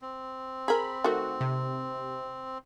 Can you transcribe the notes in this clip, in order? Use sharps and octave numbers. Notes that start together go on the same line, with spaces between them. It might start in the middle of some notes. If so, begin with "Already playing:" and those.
C4
G#4 A#4 B5
D#3 A3 F#4
C3